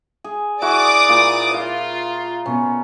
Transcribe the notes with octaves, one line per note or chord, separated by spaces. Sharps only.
G#4
E4 F#4 G#4 D5 D6 D#6
A#2
F4 F5
B2 C#4